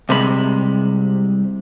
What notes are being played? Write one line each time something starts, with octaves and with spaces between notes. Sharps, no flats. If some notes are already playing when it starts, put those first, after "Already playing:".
C2 C3 G#3 B5